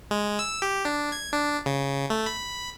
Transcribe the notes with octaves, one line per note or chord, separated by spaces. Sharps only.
G#3
E6
G4
D4
G#6
D4
C#3
A3
B5